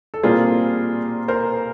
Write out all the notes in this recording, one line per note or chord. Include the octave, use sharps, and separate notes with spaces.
A4
A#2 G3 C4 F4 G#4 A#4
A#4 C5